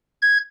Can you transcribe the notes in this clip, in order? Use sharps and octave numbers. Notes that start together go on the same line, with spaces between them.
G#6